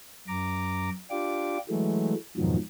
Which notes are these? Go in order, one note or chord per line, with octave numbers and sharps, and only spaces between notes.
F#2 A#5 D6
D4 F4 G4 D6
E3 F#3 G#3 A3
F2 G#2 B2 D#3 F3 F#3